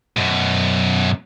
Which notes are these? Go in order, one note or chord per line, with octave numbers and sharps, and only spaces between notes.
F#2 B2